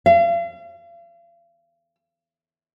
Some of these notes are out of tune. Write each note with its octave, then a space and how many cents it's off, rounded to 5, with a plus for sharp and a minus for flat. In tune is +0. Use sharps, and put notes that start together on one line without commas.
F5 -40